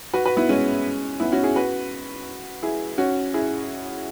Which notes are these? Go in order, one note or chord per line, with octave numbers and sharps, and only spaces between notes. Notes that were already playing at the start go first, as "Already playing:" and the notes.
F#4 B4
F#4 B4
B3 E4
G#3 C#4
B3 E4
C#4 F#4
E4 G#4
F#4 B4
E4 G#4
C#4 F#4
E4 G#4